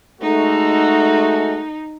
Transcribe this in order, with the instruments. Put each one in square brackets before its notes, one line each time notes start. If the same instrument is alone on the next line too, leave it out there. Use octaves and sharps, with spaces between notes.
[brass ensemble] G#3 A3 F#4 [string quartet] D#4